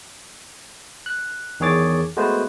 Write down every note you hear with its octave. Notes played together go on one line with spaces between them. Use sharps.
F#6
E2 D#3 G#4 C#5 D6 A6
G#3 A3 B3 F#4 B4 C5